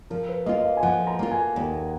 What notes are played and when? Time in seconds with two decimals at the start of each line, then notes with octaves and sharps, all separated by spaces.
0.10 F3 A#4
0.29 B4
0.46 A#3 F4 D#5
0.58 D#5
0.65 F5
0.77 G#5
0.83 F3 F#5
1.07 A#5
1.19 A#3 F4
1.31 G#5
1.56 D#2